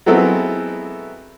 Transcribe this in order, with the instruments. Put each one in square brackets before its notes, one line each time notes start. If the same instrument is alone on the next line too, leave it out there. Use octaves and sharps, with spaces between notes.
[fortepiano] F#3 G#3 B3 C4 E4 A4